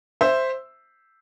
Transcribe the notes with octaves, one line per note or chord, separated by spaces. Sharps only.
C5 E5